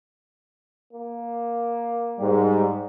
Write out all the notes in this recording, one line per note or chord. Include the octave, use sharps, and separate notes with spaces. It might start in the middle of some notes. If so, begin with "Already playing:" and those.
A#3
G#2 G3